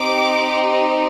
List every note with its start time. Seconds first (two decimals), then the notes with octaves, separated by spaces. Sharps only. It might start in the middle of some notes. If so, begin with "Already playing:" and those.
Already playing: C4 D#4 G4 D6